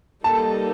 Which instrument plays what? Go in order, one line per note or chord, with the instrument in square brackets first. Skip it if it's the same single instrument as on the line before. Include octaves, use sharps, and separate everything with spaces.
[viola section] G3 A#3 D#4 A4 [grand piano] A5